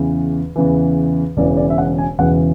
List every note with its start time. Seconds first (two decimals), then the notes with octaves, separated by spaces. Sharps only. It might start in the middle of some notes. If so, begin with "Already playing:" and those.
Already playing: E2 C#3 E3
0.56 E2 C#3 E3
1.37 E1 E2 C#3 E3 D5
1.57 D5
1.70 E5
1.78 F#5
1.98 G#5
2.19 E1 E2 C#3 E3 F#5